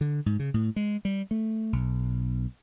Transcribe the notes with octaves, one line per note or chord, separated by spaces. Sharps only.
D3
G#2
C#3
A2
G#3
G3
A3
B1